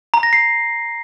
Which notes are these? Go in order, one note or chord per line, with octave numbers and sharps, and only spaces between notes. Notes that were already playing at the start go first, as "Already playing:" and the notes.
A#5
A#6
C7